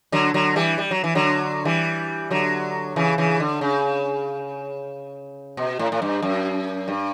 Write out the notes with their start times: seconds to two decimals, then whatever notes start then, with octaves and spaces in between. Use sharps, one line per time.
0.12 D3 F#3
0.34 D3 F#3
0.56 E3 G3
0.78 G3
0.91 F#3
1.04 E3
1.15 D3 F#3
1.65 E3 G3
2.30 D3 F#3
2.96 C#3 E3
3.18 C#3 E3
3.40 D3
3.61 C#3
5.57 B2
5.79 A2
5.92 A2
6.02 G2
6.22 F#2
6.88 G2